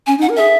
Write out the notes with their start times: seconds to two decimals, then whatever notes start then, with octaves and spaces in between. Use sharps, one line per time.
0.07 C#4 G#5
0.18 D#4
0.22 F#5
0.29 A#4
0.36 G#4 E5